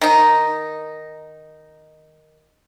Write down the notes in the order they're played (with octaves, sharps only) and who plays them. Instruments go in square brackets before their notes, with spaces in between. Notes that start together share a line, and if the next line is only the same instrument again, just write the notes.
[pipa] D#3 D#4